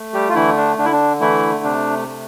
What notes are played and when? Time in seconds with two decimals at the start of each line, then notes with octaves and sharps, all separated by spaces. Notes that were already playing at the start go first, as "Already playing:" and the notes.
Already playing: A3
0.14 G3 G4
0.29 F4
0.35 D3 E3 E4
0.57 D4
0.78 D3 D4
0.85 E4
0.92 D4
1.21 E3 A3 E4
1.64 C3 D4
2.08 A3